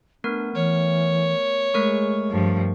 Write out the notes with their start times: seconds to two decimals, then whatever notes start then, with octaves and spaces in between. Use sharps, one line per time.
0.24 A3 B3 D4 A#4
0.55 E3 C#5
1.74 G#3 A3 A#4 C#6
2.30 G2 F3